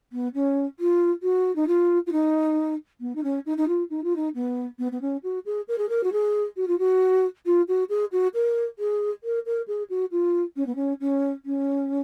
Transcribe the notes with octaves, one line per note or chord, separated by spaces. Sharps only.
B3
C#4
F4
F#4
D#4
F4
F4
D#4
B3
D#4
C#4
D#4
D#4
F4
D#4
F4
D#4
B3
B3
B3
C#4
F#4
G#4
A#4
G#4
A#4
F#4
G#4
F#4
F4
F#4
F4
F#4
G#4
F#4
A#4
G#4
A#4
A#4
G#4
F#4
F4
C#4
B3
C#4
C#4
C#4